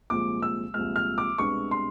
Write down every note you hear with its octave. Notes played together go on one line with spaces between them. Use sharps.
C2 A#2 F3 G#3 D6
E6
C2 A#2 F3 G#3 F6
F6
D6
C2 B2 G#3 B3 D4 C#6
C6